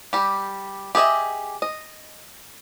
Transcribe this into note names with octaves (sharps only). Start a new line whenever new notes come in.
G3 G4
G4 G#4 B4 D#5 E5
D#5